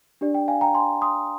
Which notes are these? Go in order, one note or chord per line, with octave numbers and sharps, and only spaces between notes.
D4 G4 D5
G5
F5 G#5
G5 A#5
G#5 C6
C6 D#6